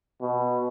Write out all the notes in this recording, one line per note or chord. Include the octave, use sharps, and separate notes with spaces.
B2